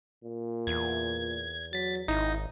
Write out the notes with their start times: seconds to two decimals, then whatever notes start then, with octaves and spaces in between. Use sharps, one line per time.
0.24 A#2
0.67 E2 G#6
1.73 F#3 A6 B6
2.08 G#1 D#4 E4